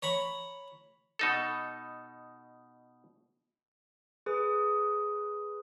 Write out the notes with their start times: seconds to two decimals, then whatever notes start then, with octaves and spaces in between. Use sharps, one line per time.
0.02 C#5 A#5 B5 C#6
1.19 B2 D#4 A4
4.26 G#4 B4 D#6